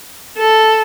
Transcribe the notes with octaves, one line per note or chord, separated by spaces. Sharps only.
A4